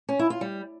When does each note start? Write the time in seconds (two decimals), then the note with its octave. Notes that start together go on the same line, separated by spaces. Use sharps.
0.09 C#4
0.19 E4
0.30 F4
0.41 G3